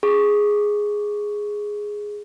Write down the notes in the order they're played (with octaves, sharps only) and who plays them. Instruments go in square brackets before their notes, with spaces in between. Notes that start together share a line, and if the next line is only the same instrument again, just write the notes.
[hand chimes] G#4 C#6